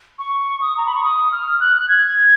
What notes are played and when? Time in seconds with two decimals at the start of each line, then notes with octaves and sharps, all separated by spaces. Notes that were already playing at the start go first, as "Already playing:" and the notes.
0.19 C#6
0.61 D#6
0.77 A#5
0.86 B5
0.95 C#6
1.03 D#6
1.32 F6
1.60 F#6
1.77 F#6
1.88 G#6